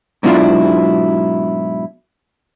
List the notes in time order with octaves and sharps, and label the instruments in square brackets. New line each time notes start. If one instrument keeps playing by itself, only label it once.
[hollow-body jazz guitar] G#2 B2 F#3 D4 E4 F4